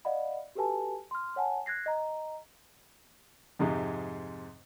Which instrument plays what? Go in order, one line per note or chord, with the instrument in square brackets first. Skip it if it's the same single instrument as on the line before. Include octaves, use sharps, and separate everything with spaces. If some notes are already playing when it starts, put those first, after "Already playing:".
[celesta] D5 D#5 F5 F#5 B5
F#4 G4 A4 B4 G#5 A5
C6 F6
C#5 F#5 G#5 A5
F#6 G#6 A#6 C7
D#5 A#5
[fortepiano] F2 G#2 C3 G#3